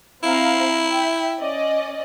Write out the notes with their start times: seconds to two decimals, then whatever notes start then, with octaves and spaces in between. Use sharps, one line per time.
0.23 C4 E4 F5 A#5
0.87 E5 G5
1.39 C#4 D5 D#5